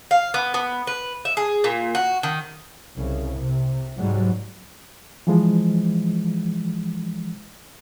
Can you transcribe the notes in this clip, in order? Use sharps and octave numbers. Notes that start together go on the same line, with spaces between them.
F5
B3
B3
B4
E5
G#4
A#2
F#4
D#3
C2 C#3
C3
G#2 F#3 G3
E3 F3 G#3